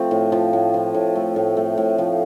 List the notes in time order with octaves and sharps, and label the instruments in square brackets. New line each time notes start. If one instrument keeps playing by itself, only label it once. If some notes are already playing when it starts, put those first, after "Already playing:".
Already playing: [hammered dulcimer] F3 A3 C4
A2
F3
A2
F3
A2
A3
A2
A3
A2
F3